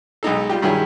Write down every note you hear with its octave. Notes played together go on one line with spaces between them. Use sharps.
B1 G#3 D#4 A4
G3 F4 G4
G2 D#3 F#3 E4 G#4